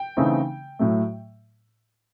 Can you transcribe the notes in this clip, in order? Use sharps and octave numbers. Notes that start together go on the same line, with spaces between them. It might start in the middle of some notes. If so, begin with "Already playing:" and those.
Already playing: G5
C#3 E3 A3 C4 D#4
A2 F#3 A3